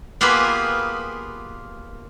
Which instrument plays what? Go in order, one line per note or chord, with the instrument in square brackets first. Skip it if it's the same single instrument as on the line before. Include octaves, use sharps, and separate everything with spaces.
[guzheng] A#3 B3 F4 G4 G#4 B4